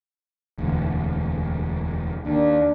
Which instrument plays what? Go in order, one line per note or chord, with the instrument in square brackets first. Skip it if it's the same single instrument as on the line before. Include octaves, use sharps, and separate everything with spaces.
[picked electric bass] E1 D2
[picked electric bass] D#2 [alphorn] D4